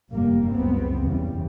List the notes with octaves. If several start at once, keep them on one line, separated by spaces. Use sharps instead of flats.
F1 G2 G3 A#3
F#1 C#2 B3 C4
E2 C#3 G3